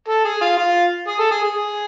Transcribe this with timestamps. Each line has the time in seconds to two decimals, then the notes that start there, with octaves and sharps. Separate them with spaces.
0.08 A4
0.25 G#4
0.41 F4
0.57 F4
1.07 G#4
1.19 A4
1.31 G#4
1.43 G#4